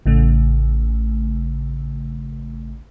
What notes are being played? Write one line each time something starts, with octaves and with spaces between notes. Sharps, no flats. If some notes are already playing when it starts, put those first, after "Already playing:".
A1 C#3 A3